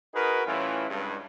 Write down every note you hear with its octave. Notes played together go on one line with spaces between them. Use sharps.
D#4 F#4 G#4 A#4 B4
A2 E3 G3 C#4 E4 F4
C#2 G2